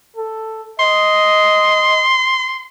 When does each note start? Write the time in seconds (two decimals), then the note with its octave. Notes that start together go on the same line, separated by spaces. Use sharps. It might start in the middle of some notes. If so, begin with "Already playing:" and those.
0.16 A4
0.80 D#5 C6